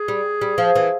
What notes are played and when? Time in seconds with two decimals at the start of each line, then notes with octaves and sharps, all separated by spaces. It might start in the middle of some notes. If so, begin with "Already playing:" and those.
Already playing: G#4
0.08 G3
0.41 G3
0.58 F3
0.75 E3